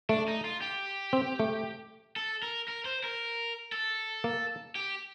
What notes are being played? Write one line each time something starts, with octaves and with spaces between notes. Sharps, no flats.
A3 D4
D#4
F4
G4
C4
A3
A4
A#4
A#4
C5
A#4
A4
A#3
G4